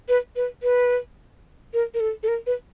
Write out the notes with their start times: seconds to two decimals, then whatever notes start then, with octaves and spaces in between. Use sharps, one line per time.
0.09 B4
0.36 B4
0.63 B4
1.74 A#4
1.94 A#4
2.00 A4
2.23 A4
2.28 A#4
2.47 B4